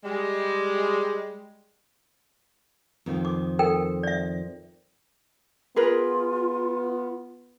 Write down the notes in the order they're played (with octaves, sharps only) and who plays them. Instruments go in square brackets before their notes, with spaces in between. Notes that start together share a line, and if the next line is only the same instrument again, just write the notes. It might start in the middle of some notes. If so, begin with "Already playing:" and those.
[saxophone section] G3 G#3
[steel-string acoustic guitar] F2 D#3 F3
[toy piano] D6
A4 A#4 G5
D5 E5
[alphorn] B3 [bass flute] F4 [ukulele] G#4 A#4 B4